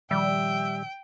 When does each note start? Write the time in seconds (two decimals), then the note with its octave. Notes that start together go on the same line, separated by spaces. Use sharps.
0.11 A#2 D#3 F3 G3 E5 G5